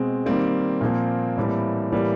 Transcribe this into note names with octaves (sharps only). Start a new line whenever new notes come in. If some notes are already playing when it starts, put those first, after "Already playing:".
Already playing: B2 G#3 C4
D#3 G3 A#3 C4
A#2 F3 A#3
A2 E3 G3 A#3
A2 E3 G3 A#3